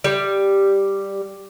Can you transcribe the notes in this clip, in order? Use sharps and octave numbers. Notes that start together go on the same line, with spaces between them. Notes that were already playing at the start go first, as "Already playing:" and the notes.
G3